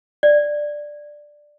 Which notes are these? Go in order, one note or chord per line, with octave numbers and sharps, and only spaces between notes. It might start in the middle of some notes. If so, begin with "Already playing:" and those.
D5